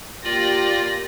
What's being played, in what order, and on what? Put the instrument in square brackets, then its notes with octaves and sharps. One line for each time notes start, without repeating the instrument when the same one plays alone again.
[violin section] A#3 G4 A#6 [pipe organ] F4 D5